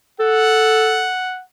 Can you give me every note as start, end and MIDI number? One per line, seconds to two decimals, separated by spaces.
0.20 1.10 69
0.20 1.42 78